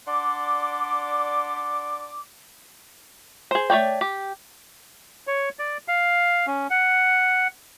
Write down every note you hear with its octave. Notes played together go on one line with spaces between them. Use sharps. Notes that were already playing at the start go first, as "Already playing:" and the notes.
D4 D5 F#5 C6 D6
G#4 C5
A3 C#5 D5 G5
G4
C#5
D5
F5
C#4
F#5